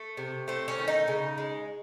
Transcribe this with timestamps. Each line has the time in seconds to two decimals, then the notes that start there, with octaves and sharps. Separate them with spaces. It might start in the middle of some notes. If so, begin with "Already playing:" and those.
Already playing: A3
0.17 C3
0.48 A3 C4
0.68 C#4
0.79 D#3
0.88 D#4
1.08 C#3
1.38 G#3